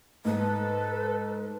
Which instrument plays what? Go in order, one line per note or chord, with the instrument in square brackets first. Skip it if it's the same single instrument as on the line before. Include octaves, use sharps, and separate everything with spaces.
[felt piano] G#2 [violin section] A4 [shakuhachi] B4